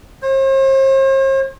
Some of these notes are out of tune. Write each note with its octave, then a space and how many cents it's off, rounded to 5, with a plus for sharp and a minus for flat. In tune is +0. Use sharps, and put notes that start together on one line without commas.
C5 +45